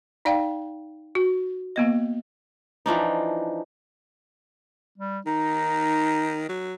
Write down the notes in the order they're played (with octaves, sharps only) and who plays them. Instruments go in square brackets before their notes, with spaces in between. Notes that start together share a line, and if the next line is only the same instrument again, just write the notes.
[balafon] D#4 D5 F5 G5
F#4
A#3 B3 D#5
[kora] E3 F3 D4 D#4
[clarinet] G3
[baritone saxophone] D#3 [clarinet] D#4
[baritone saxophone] F#3